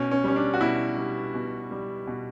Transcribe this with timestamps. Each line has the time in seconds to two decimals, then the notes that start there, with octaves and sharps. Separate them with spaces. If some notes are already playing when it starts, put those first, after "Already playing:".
Already playing: B2 C#4
0.11 C#4
0.24 G3 C#4
0.36 D4
0.54 F#4
0.60 B2 E4
0.97 G3
1.34 B2
1.71 G3
2.07 B2